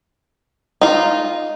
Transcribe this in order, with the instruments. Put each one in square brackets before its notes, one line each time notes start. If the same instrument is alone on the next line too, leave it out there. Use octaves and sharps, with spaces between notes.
[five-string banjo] D#4 F4